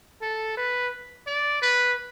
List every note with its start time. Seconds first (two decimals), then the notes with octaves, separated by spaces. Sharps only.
0.22 A4
0.57 B4
1.27 D5
1.62 B4